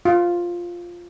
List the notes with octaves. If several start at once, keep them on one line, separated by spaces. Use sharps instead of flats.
F4